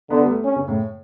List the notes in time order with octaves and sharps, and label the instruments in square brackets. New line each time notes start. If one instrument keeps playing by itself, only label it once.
[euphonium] D3 [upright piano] B3
[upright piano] G3
A3
[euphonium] C#4
[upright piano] C#3
A2